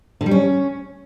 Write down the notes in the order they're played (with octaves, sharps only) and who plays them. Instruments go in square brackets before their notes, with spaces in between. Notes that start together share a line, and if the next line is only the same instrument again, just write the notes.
[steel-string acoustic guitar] D3
G3
C#4